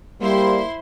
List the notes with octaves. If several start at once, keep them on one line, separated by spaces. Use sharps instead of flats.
G3 A#3 E4 C5 C6